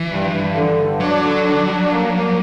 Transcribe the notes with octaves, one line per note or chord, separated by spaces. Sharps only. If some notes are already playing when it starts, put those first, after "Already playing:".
Already playing: E3
G2
G2
D3
G2
F#3 D4
D3
D4
D4
A#3
A#3